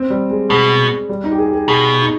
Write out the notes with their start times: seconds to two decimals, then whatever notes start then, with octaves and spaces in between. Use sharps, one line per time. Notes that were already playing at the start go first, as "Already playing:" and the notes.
Already playing: C4
0.10 G3
0.30 G#3
0.50 B2 G#3
1.09 G3
1.24 D#4
1.32 G4
1.38 G#4
1.46 G4
1.53 G#4
1.68 B2 G#4
2.02 D#4